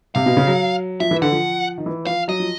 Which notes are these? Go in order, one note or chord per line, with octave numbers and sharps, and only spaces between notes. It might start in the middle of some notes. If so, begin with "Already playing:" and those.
C3 F5
B2
C#3
F#3
F3 E5
E3
D3 F#5
F3
D#3
E3
F3 F5
F#3 D#5
F3